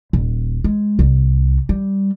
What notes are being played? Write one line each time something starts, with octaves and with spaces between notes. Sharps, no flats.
D#1
G#3
C2
G3